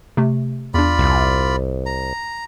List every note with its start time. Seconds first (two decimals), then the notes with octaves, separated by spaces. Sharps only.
0.17 C3 A3
0.74 E2 D4 F4 D5 B5
0.99 C2
1.86 A#5